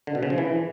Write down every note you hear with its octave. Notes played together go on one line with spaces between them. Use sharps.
D3
B2
C#3
F3
E3